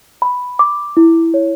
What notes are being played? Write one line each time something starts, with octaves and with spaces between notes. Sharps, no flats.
B5
D6
E4
C#5